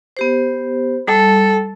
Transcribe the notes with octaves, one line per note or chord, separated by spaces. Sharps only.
B3 G4 C5
G3 A4